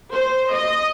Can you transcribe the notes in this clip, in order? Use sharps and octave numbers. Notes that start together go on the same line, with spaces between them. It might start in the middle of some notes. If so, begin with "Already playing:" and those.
C5
D#5